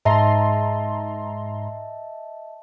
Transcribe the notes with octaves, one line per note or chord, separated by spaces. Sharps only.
G#2 D#5 E5 A5 A#5 C6